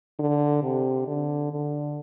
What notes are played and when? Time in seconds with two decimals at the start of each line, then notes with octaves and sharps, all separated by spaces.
0.19 D3
0.62 C3
1.08 D3
1.52 D3